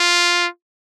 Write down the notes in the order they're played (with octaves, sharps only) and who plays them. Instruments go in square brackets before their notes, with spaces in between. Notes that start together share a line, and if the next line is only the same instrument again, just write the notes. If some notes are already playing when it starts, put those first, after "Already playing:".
Already playing: [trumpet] F4